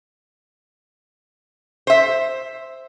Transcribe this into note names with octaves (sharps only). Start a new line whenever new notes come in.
C5 E5